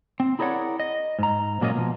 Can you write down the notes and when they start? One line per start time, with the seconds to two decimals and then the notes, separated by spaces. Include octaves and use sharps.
0.20 C4
0.39 E4 G#4 A#4 C#5 D5 F#5
0.80 D#5
1.19 G#2 A#5
1.61 A#2 F#3 A#3 C#4 F4 D#5
1.75 B2 F3